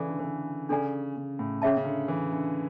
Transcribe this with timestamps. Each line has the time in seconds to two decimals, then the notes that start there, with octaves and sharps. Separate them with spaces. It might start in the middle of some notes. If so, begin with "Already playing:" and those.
Already playing: C#3 E3 A4 D5
0.09 D3
0.19 E3
0.24 D3
0.69 C#3 D4 A4 D5 G#5
1.17 C#3
1.39 A2
1.62 C#3 C#4 G#4 C#5 E5 A5
1.77 C#3
1.85 D3
2.08 E3
2.32 D3